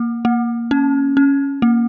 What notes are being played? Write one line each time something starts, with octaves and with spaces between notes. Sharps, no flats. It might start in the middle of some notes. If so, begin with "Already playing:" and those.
Already playing: A#3
A#3
C#4
C#4
A#3